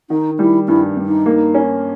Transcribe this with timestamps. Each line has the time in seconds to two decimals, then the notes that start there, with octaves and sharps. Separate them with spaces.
0.10 D#3 D#4
0.39 G3 E4
0.68 G2 E4
0.97 G2
1.06 D#4
1.26 A#3
1.55 C#4